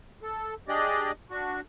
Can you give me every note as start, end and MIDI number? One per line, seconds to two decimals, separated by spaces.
0.23 0.54 69
0.68 1.11 62
0.68 1.11 67
0.68 1.11 68
0.68 1.11 74
0.68 1.11 75
1.30 1.60 62
1.30 1.60 66